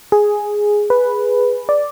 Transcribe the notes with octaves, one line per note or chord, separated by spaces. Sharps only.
G#4
B4
D5